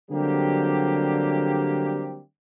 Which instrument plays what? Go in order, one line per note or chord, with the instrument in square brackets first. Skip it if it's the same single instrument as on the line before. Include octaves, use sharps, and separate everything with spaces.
[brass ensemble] D3 F#3 G3 A#3 C4 G4